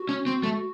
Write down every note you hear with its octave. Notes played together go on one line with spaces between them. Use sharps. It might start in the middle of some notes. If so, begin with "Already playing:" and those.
Already playing: F#4
C#4
C4
A3